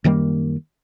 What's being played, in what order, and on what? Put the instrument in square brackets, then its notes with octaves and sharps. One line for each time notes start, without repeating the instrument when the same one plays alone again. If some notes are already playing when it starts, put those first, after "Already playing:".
[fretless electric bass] F#2 D#3 G3 A#3